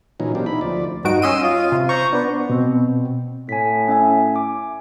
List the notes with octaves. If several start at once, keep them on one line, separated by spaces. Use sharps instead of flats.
A#2 E3 F#3 C#4 D#4
B2 A#3 C4 D4 G4
D#4 E4 B5
D2 F3 D5
G2 D#4 F#4 D7
C#4 D#5 C6 E6 D#7
F4
C3
C5 A#5 C#6
B3 D4
B2 C4
A2 G#5 B6
C#4 E5 G#5
G#5 D6